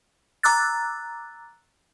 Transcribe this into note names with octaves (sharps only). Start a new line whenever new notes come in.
A#5 D6 E6 F#6 A6